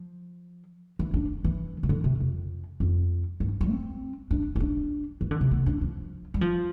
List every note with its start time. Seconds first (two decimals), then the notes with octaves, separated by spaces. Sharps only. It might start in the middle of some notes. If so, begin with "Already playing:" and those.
Already playing: F3
0.99 E3
1.14 D4
1.44 E3
1.83 C3
1.89 D3
2.04 C3
2.20 F2
2.80 F2
3.40 G2
3.61 F3
3.70 C4
4.31 D4
4.56 E4
4.60 D4
5.21 E3
5.31 D3
5.41 C3
5.51 B3
5.66 D4
5.81 F3
6.34 G3
6.41 F3